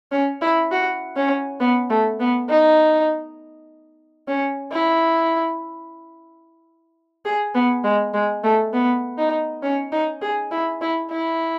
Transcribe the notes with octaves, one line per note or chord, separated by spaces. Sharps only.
C#4
E4
F#4
C#4
B3
A3
B3
D#4
C#4
E4
G#4
B3
G#3
G#3
A3
B3
D#4
C#4
D#4
G#4
E4
E4
E4